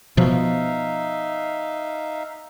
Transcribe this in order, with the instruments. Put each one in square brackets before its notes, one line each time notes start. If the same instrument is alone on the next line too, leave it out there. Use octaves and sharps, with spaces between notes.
[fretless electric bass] B2 F3 [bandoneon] D#4 E5 F5